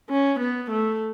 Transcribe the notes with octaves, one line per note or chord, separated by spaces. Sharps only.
C#4
B3
A3